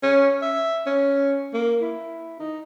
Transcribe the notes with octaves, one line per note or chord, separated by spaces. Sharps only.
C#4
E5
C#4
A#3
E4
D#4